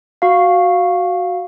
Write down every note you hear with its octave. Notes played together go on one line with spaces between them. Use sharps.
F#4 F5